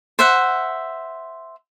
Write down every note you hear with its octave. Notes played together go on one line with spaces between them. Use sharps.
C5 E5 F#5